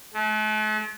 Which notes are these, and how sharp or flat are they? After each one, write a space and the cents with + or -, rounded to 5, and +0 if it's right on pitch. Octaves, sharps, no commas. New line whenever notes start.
A3 -45